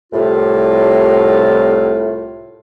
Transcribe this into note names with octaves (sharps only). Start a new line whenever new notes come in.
C2 A2 F4